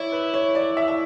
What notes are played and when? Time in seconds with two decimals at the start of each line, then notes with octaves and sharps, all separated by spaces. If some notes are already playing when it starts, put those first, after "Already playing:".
Already playing: E4 C#5 D5
0.12 B4
0.34 C#5
0.55 D5
0.77 E5
0.88 E5